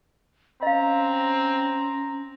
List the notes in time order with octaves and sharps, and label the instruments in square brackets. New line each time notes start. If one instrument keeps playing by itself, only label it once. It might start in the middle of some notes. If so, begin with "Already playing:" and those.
[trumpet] C4 [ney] C#4 [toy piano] D#5 F5 [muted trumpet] A#5